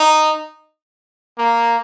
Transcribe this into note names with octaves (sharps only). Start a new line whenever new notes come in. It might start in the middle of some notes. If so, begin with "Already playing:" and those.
Already playing: D#4
A#3